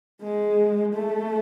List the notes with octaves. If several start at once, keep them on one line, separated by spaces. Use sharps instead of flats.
G#3
A3